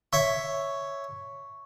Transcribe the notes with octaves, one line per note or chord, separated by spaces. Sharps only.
C#5 E5 C#6